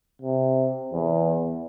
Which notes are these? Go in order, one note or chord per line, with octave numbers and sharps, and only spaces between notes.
C3
E2